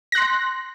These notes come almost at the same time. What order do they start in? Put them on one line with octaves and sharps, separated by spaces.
A#6 F#6 C6